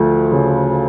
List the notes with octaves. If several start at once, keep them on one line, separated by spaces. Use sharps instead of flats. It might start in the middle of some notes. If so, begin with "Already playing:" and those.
Already playing: D2 F3 A3
C#3